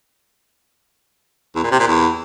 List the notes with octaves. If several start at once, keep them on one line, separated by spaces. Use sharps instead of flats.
E2
A#2
C3
A#2
E2